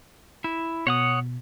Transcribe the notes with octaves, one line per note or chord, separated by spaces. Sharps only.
E4
B2 C#5 F#5 D#6